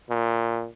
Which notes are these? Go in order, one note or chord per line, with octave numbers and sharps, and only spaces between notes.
A#2